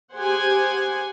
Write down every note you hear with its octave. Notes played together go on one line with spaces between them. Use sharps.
G4 G#4 C5 F#5 G#5